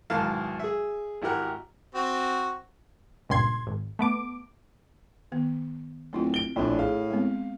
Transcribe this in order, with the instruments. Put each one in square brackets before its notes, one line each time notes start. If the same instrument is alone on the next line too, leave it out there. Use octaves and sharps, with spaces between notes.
[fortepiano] B1 G#2 D#3 E4 F5 A5
G#4 E5
G#1 E4 G4 A#4 F#5
[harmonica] C4 F#4
[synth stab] C#2 G2 A#2 C6 G#6
G#1
A3 B3 D6
[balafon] D#3 B3
[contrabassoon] D1 [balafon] C4 E4 F4
[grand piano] D7 G7
[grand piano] A#1 D4 [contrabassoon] A2
[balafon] G#4 [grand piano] F5
[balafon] G#3 B3 C4